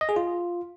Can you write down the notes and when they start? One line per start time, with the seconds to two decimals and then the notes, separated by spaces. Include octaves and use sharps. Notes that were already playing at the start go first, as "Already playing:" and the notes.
0.01 D#5
0.09 G#4
0.16 F4